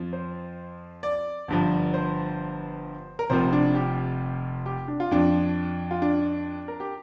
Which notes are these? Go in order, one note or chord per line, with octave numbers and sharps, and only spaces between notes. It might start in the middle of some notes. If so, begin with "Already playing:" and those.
Already playing: F2 F3
C5
D5
G1 G2 F3
C5
A#4
F1 F2 C3 F3 C5
D4
G4
G4
D4
F4
F2 F3 D4
F4
D4
A#4
G4